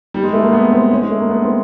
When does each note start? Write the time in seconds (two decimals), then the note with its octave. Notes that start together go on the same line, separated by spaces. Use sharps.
0.14 G3
0.23 G#3
0.33 A3
0.43 A#3
0.53 B3
0.72 C4
0.91 C#4
1.01 G#3
1.10 A3
1.20 A#3
1.29 B3
1.43 C4